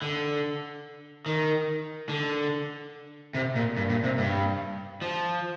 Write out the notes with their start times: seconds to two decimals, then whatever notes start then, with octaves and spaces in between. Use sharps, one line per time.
0.02 D3
1.26 D#3
2.09 D3
3.35 C3
3.56 A#2
3.77 G2
3.90 A#2
4.04 C3
4.18 G2
5.02 F3